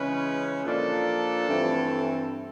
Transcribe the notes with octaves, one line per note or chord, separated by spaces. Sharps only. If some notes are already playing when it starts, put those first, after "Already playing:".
Already playing: C#3 E3 G#3 C#4 B4
A#2 F3 A#3 D4 A4
G2 E3 A3 C4